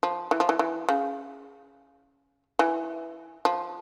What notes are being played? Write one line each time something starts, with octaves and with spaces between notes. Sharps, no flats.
F3
E3
F3
E3
E3
C#3
E3
F3